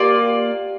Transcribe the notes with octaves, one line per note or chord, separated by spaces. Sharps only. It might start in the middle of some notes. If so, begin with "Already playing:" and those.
Already playing: A#3 F4 G4 D5